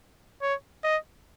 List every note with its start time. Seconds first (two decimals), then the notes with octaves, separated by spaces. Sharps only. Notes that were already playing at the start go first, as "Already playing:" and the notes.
0.42 C#5
0.84 D#5